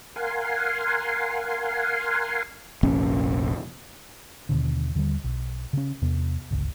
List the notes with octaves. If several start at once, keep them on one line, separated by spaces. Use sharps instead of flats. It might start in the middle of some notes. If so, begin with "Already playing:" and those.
A#4 F5 F#5 G#5 C6
F1 A#1 C#4
D#2 B2 D3
D#2 D3 E3 G3
B1
C#3 C#4
E2 C3 B3
G1 C#2